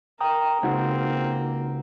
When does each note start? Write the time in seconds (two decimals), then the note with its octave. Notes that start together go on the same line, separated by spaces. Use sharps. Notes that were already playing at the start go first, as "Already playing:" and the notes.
0.21 A#4 G5 A#5 D#6
0.63 C#2 A#3 C4 D#4 F#4 F#5